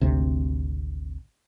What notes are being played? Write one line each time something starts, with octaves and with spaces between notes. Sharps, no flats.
G#1 D2 C3